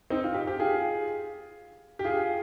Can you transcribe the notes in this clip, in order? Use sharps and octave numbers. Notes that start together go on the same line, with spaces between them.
C4 D#4
F4
D#4 G4
G4
F4 G#4
G4
F4 G#4